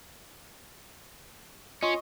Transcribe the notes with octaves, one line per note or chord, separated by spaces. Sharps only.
C#4 F4 D#5 C6 C#6